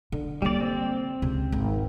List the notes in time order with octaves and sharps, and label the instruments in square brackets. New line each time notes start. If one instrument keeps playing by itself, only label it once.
[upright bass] D3
[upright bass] D3 A#3 [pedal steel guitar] G3 D5
[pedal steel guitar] C4
[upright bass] C#2 C3
G#1